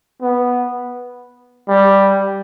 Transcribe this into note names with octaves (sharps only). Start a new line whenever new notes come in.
B3
G3